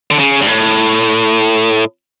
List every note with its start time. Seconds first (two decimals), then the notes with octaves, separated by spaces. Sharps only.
0.11 D3
0.19 C#3
0.42 G2
0.47 A2